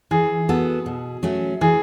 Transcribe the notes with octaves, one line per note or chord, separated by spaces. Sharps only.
E3 G#4
B3 F#4 A4
B2
F#3 A3 C#4
E3 G#4